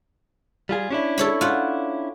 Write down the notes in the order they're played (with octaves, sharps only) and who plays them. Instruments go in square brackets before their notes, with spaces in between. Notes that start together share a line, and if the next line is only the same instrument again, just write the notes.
[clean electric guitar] G3 F4 G#4
C#4 D4 E4
[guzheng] A4 C#5 B5
F4 F#5